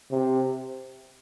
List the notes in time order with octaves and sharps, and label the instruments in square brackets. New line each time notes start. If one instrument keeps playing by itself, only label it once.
[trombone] C3